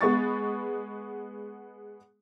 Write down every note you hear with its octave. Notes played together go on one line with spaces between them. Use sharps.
G#3 B3 C#6 A6